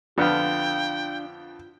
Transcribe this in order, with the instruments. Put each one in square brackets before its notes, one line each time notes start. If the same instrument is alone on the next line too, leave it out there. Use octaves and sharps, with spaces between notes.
[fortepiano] F2 D3 B3 [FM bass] D4 [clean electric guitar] F4 F5 [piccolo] G5